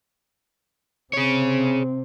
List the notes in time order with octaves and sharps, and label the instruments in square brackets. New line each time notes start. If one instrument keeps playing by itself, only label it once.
[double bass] C3 C4 [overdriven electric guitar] G#4 C#5